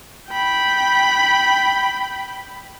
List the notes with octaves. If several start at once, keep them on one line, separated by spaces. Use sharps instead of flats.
G5 B5